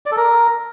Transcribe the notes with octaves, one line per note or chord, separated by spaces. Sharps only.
D5
A4
A#4